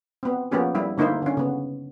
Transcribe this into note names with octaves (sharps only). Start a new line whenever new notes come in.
B3 C4
F3 A#3 B3 C#4 G4 G#4
G3 E4
D3 A#3 D#4 E4 C5
D3 C#4
C#3 B3